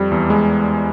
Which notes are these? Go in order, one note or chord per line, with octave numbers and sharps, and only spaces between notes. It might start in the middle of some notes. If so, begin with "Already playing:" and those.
Already playing: F2 G3
E2
G#3